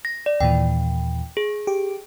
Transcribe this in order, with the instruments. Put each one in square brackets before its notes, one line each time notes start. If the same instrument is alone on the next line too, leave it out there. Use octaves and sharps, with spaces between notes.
[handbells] A#6
D5
[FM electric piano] D#2 A#2 E3 [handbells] G5
[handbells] G#4
[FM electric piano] G4